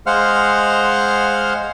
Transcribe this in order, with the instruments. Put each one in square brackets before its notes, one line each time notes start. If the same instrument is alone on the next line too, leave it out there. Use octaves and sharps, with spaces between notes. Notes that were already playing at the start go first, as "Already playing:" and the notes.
[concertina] G#3 C5 F5 F#5 F6